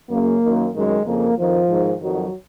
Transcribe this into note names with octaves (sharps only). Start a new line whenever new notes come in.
F#2 C#3 A#3
F#2 D#3
F#2 D#3 G#3
F2 C#3 A#3
F2 D#3 F3
G#2 D#3
F2 D#3 F#3